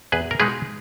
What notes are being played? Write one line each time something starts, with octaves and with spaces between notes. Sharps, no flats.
E2 G#4 B4
A#4
B2 G#3 D#4 G#4 B4